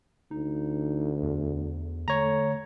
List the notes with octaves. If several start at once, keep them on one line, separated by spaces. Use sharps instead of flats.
D2 D#4
E2
D3 A3 C#5 A#5